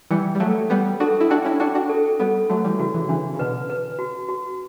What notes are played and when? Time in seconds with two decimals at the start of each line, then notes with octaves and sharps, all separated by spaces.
0.11 E3 G3 G5
0.35 G3
0.40 F#3 A3 A4
0.70 G3 B3 G5
1.00 D4 F#4 A4
1.20 E4
1.30 D4 F#4 G5
1.45 C#4 E4
1.60 D4 F#4 G5
1.75 D4 F#4
1.89 A4
2.20 G3 B3 A4
2.49 F#3 A3 F#4
2.64 E3 G3
2.79 C#3 E3 F#4
2.94 C#3 E3
3.09 C#3 E3 D4
3.34 C#3
3.39 B2 D3 B4
3.70 B4
3.99 F#4
4.29 F#4